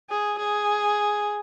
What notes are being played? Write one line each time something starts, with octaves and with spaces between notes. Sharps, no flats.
G#4
G#4